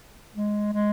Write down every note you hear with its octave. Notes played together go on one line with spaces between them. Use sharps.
G#3
G#3